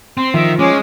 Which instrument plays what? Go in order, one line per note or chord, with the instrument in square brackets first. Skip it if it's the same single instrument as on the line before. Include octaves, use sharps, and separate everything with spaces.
[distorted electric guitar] C4 [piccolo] C6
[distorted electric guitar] D#3 [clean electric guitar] F3 [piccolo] E5
[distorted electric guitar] G#3 [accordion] C#4 [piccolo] D6